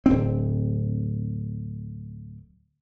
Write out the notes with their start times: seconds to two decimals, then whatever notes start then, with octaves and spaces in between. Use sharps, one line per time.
0.06 D1 C4